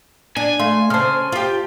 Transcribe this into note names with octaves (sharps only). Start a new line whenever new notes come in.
D4 G#5
A3 F5 C6
C#3 C5 A5 C6 F6
F4 G4